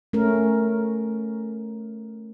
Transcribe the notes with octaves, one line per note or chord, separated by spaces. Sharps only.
A3 C#4 A#4